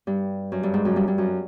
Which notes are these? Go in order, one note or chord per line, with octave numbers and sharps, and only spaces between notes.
G2
F#2
G2
G#2
F#2
G2
G2
F#2